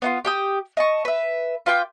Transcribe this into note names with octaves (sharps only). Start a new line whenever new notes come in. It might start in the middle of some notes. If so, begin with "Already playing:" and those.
B3 D#4 F4
G4 G5 D#6
D#5 A5 C#6
B4 E5
F4 B4 G5 D6